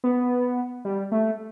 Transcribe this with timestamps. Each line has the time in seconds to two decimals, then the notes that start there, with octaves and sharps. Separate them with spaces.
0.04 B3
0.85 G3
1.12 A3